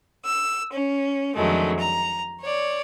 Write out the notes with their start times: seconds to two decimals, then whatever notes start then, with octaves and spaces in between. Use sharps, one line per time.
0.24 E6
0.72 C#4
1.35 F2 D3 D#3 F#3 G#3 A3
1.78 A#5
2.41 C#5 D5